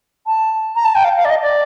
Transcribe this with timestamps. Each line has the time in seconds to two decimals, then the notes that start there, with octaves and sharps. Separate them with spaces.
0.26 A5
0.75 A#5
0.84 A5
0.95 G5
1.04 F5
1.16 F5
1.24 D5
1.29 D#5
1.42 D5